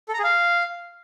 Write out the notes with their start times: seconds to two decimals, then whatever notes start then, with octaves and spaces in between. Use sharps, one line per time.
0.09 A4
0.14 A#5
0.19 G#4
0.24 F5